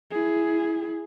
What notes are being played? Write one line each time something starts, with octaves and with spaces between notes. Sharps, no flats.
E4 G#4